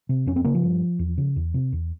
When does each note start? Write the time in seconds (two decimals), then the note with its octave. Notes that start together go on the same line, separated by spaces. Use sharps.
0.09 C3
0.26 F2 C#4
0.36 C4
0.44 C#3 A#3
0.54 F3
0.63 G2
0.99 E2
1.18 C#3
1.36 E2
1.54 C3
1.73 E2